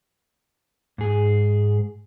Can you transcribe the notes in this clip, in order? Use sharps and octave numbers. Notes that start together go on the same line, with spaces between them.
G#2 G#4